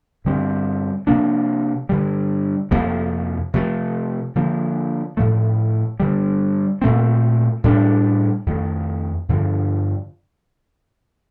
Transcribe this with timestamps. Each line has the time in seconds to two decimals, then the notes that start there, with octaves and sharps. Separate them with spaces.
0.25 G2 D3 G3 C4
1.07 C3 F3 A#3 D4
1.89 G2 D3 G3
2.71 F2 C3 F3 A#3
3.54 C3 F3 A3
4.35 D3 F3 A#3
5.17 A2 F3 A3
6.00 G2 D3 G3
6.82 A#2 A3 C4
7.64 A2 G3 D4
8.46 F2 D#3 A3
9.29 G2 D3 F3